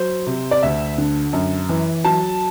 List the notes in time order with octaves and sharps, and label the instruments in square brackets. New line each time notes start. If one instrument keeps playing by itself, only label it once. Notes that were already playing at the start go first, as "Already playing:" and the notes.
Already playing: [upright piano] F#3 C5
C3
D5
D2 E5
D3
F#2
E3
F#3 A5